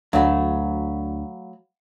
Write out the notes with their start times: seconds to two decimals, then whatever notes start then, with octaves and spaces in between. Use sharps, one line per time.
0.13 D2 F#3 A3 F5 F#5 B5